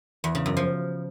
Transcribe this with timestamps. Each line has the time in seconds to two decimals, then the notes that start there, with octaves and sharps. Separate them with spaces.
0.24 E2
0.35 C#3
0.46 F#2
0.57 F3